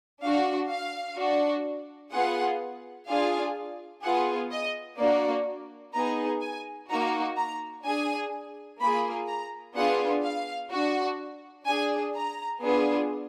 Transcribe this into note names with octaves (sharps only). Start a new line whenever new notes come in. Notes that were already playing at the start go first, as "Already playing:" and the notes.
D4 F#4 F5
F5
D4 F#4
B3 F4 G#4 F#5
D4 F4 G#4 F5
B3 F4 G#4 F#5
D#5
A#3 D4 F#4 D5
B3 D#4 G#4 A#5
G#5
A#3 D#4 F#4 A#5
A#5
D4 G#4 G#5
A#3 F4 G#4 B5
A#5
B3 D4 F4 G#4 F#5
F5
D4 F#4
D4 G#4 G#5
A#5
B3 D4 F4 G#4